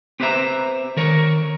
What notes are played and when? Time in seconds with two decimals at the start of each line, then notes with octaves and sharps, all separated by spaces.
0.20 C4 G4 B4 C5 E5 A#5
0.97 D#3 A#4 C#5